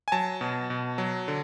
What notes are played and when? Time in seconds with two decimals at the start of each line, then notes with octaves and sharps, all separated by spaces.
0.08 G#5
0.12 F#3 A5
0.41 B2
0.70 B2
0.98 F#3
1.28 D3